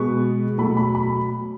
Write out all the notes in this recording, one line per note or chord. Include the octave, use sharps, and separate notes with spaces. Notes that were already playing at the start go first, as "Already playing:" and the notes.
Already playing: B2 G#3 B3 C#6
B2 F#3 A3 B5
B5
B5